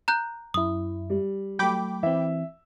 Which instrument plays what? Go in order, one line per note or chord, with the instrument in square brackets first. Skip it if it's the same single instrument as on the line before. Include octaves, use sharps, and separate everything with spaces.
[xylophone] A#5 F#6 G6
[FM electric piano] F#2 E4 [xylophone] D#6
[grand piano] G3
[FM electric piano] F#3 A3 [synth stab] G5 B5 D6
[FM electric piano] E3 C4 [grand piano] E5